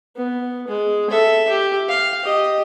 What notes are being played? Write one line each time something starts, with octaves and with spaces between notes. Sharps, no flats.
B3
G#3
A4 E5
G4
F5
G4 D#5